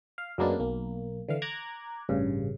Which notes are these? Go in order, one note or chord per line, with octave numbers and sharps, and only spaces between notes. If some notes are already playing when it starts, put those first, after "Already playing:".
F5
F#2 F#3 G#3 A#3 B3 D4
B1 A#3
D3 E3 F5
A#5 D6 F#6 G#6
A1 G2 C#3